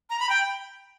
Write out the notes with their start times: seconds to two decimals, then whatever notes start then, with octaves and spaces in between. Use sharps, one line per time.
0.10 A#5
0.20 B5
0.29 G5